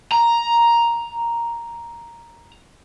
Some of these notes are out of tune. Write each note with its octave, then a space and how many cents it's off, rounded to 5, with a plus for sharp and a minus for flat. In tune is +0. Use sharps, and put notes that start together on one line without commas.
A#5 +5